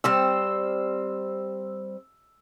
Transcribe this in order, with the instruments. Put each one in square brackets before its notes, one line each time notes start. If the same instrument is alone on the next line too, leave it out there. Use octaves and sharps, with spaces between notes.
[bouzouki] G3 C4 C5 [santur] E6